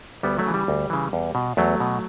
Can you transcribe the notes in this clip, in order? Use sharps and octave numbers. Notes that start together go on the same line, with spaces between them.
D2 G3 B3
F#3 A3
C#3 E3
G3
D2
C#3 E3
E2
B2
E2 F#3 A3
B2